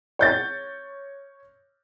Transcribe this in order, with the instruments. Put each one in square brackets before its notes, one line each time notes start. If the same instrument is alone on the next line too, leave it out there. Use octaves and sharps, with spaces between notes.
[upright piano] C#5 G6 A6